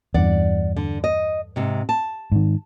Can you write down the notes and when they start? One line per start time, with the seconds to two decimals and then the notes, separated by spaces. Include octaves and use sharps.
0.14 E2 G2 D5 F#5
0.76 D3
1.04 D#5
1.56 G#2 C3
1.89 A5
2.32 G#2 D#3